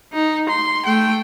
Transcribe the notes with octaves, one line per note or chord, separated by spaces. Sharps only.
D#4
C6
A3 G5